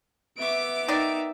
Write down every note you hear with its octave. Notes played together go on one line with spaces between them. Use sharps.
B3 E5 D6 D7
D#3 D#4 D5 E5